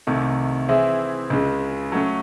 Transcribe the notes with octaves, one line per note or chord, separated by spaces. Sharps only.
C2 C3 D#3 A3
E3 C4 E4 G#4
C#2 C#3 G#3
F#3 A3 C#4